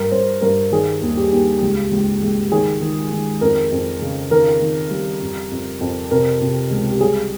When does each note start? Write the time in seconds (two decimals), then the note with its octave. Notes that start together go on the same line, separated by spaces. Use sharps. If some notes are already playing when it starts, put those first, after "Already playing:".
Already playing: G2 A#4
0.11 G2 C5
0.41 G2 A#4
0.72 D#3 G#4
1.02 D#2
1.17 G4
1.32 D#2
1.62 C#2
1.91 C#2
2.22 C#2
2.52 D#3 G#4
2.81 D#3
3.12 D#3
3.41 F2 A#4
3.71 F2
4.02 C#3
4.31 D#3 A#4
4.62 D#3
4.91 G3
5.22 F2
5.51 F2
5.80 F2
6.11 C3 A#4
6.41 C3
6.71 C#2
6.91 G4
7.01 G3 G#4